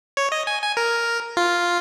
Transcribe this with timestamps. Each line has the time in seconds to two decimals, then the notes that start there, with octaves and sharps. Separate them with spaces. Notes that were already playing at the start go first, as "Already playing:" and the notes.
0.17 C#5
0.32 D#5
0.47 G#5
0.62 G#5
0.77 A#4
1.37 F4